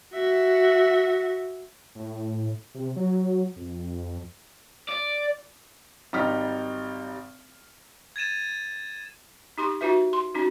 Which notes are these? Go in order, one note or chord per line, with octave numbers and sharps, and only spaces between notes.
F#4 E5
A2
C3
F#3
F2
D5
G#1 G3 D#4 A#5 F6 B6
G#6 A6 D#7 E7
D#4 G4 C6 C#6
D#4 F4 F#4 B4 E5
C6
C#4 D#4 F#4